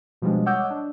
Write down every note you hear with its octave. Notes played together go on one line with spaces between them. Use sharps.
B2 F3 G3 G#3 D4
C#5 D#5 F#5 D6 E6 G6
D4